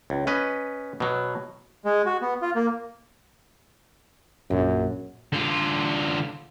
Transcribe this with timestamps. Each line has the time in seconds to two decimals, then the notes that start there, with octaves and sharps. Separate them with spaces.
0.10 C#2
0.27 C#4 B4 D#5
1.00 B2 F#3
1.85 G#3
2.06 F#4
2.22 B3
2.42 F4
2.55 A#3
4.50 A#1 F#2
5.33 D3 F4